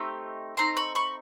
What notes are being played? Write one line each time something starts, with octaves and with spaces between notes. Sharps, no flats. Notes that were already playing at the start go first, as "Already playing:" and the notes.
Already playing: A3 C4 D#4 G4
A3 C4 D#4 A#5 C6
B5 C#6
B5 C#6